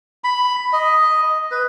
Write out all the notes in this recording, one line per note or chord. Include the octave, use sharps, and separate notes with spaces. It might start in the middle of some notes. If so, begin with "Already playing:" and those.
B5
D#5
B4